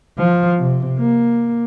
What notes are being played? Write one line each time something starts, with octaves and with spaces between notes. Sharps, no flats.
F3
C3
A#3